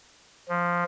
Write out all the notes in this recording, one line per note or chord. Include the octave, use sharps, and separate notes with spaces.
F3